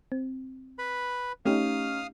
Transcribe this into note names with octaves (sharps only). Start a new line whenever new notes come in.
C4
B4 B5
A3 C#4 D#4 G4 F5 D#6 F6